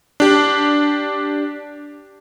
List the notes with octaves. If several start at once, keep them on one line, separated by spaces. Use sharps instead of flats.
D4 G4